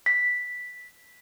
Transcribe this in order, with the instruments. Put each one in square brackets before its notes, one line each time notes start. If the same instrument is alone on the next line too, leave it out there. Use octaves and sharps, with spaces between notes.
[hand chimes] B6